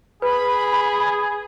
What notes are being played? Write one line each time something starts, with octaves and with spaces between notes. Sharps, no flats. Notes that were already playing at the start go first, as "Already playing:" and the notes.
G#4 B4 B5